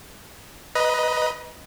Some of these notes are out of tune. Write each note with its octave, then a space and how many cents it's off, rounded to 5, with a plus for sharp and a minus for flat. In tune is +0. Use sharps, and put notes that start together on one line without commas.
B4 +5 D#5 +5 A#5 +40